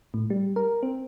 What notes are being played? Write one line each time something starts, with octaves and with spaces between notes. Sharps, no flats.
A2
G3
A#4
C4